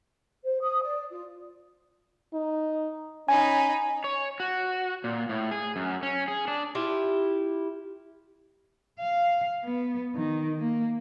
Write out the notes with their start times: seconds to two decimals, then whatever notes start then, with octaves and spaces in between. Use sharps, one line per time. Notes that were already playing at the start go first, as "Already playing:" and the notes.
0.45 C5
0.62 D#6
0.83 D5
1.11 F4
2.34 D#4
3.28 C#4 D#4 G#5 B5
4.04 C#5
4.40 F#4
5.04 A#2
5.29 A2
5.51 G#4
5.76 F#2
6.03 C#4
6.28 G#4
6.48 D4
6.75 E4 F4 G4
8.99 F5
9.64 B3
10.15 D#3
10.60 A#3